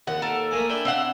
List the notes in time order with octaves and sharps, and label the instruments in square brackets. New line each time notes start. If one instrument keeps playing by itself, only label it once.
[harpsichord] D#2 [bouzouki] F#5
[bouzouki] A4 A#4
[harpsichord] A3 A#3 G#4
D4 E4 G5
[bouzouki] C4 F5 F#5